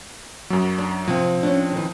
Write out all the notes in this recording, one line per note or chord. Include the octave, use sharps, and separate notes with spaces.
F#2 F#3
D4
C3 F3 C4
C#4 D4
D#3 E3